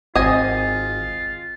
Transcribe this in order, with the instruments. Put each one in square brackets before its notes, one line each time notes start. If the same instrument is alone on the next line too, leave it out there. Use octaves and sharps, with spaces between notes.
[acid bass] G#1 [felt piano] C4 [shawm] F4 [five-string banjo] D#5 G#5